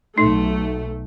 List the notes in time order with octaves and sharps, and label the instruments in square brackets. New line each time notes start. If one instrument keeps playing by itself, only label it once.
[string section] B1 A3 [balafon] D#4